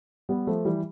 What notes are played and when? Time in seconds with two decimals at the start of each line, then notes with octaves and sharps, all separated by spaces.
0.29 G3 B3
0.47 F3 A3
0.65 E3 G3